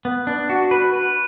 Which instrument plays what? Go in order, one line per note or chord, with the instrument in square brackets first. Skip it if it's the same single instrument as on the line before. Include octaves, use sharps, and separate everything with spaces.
[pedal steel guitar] B3
D4
F#4
B4
B4